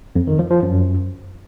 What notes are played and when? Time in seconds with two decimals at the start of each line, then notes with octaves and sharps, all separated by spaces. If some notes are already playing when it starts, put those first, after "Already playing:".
0.16 F2
0.27 D#3
0.39 F3
0.51 F3
0.62 F#2